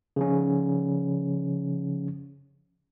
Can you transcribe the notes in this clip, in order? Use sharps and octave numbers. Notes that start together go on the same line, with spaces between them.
C#3 F3 C#4